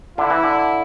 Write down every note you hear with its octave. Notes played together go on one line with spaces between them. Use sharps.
D3 E4
E3
D3